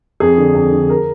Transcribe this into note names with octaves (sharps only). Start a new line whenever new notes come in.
F2 G#4
D3
F2
D3
A#4